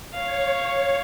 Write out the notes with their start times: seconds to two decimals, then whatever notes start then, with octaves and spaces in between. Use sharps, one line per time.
0.14 C#5 F5